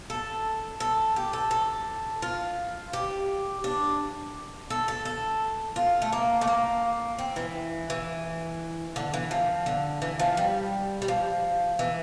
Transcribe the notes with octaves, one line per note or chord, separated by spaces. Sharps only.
A4
A4
G4
A4
A4
F4
G4
D4
A4
A4
A4
F4
A3
A#3
A3
A#3
C4
E3
E3
D3
E3
F3
D3
E3
F3
G3
G3
F3
E3